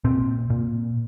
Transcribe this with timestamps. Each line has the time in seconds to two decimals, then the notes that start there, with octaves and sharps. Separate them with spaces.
0.04 A#2 C4
0.50 A#2